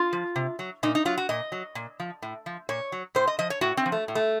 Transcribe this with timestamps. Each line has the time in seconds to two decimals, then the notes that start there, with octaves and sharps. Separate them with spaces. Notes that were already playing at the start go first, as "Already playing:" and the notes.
Already playing: F4
0.13 F3
0.36 C3
0.59 F#3
0.83 A#2 D#4
0.95 D#4
1.05 F#3 F4
1.18 F#4
1.29 A#2 D#5
1.52 F#3
1.75 A#2
2.00 F3
2.22 A2
2.46 F3
2.69 A#2 C#5
2.92 F#3
3.15 A2 C5
3.27 D#5
3.39 F3 D#5
3.50 C#5
3.61 A2 F#4
3.77 C4
3.86 F3
3.92 A3
4.08 A2
4.15 A3